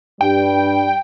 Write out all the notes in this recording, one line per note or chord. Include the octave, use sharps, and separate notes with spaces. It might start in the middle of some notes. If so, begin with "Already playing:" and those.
G2 G3 G5